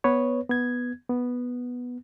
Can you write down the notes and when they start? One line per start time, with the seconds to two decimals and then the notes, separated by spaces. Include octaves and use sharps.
0.04 B3 B4 C#5
0.49 B3 G#6
1.10 B3